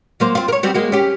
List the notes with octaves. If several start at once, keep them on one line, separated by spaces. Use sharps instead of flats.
F#3 A#3 C5
C4 F4
A#4 C#5
G3 C4 F#4
G#3 A#3 F#4
C#4 G4